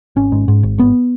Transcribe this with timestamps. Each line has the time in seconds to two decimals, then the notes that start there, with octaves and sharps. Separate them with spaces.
0.16 G#1 C#4
0.32 G#2
0.48 G#2
0.63 G#1
0.78 G#1 B3